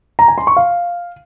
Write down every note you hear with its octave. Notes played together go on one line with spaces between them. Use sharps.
A#5
G#5
C6
C#6
F5